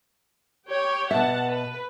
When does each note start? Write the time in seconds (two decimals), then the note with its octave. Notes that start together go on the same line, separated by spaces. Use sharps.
0.68 G4 C#5 G5
1.11 B2 E5 F#5 A5
1.48 B4